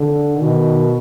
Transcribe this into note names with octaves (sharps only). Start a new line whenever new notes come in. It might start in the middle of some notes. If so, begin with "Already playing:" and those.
Already playing: D3
B2 D#3